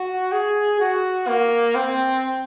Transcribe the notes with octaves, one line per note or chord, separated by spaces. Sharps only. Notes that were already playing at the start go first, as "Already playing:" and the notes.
Already playing: F#4
G#4
F#4
A#3
C4